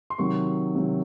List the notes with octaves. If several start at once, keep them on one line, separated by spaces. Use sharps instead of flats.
C6
C3 D#3 F#3 C#6
C3 D#3 F#3